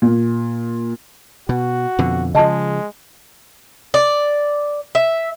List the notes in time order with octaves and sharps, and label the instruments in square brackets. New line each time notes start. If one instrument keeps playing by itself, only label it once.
[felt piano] A#2
[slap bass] B2 [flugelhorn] F#4
[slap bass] F2 B2 D3
[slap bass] C#3 F3 [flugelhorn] G#3 [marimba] D#5 A5
[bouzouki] D5
E5